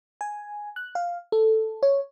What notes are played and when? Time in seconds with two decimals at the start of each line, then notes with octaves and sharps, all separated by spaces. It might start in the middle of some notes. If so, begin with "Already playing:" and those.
0.21 G#5
0.76 F#6
0.95 F5
1.32 A4
1.83 C#5